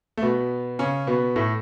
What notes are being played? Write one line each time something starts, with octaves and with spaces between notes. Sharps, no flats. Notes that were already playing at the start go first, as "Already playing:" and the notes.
A3
B2 B3
C#3 C#4
B2 B3
A2 A3